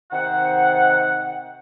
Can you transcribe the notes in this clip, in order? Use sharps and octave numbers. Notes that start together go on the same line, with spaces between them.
C3 D#3 C5 F#5